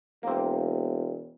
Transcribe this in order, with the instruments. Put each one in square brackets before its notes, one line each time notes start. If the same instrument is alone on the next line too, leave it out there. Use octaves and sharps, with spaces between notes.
[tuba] E1 [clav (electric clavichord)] A#3 C4